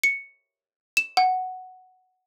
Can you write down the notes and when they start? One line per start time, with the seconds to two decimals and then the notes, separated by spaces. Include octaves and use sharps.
0.03 C#7
0.97 E7
1.17 F#5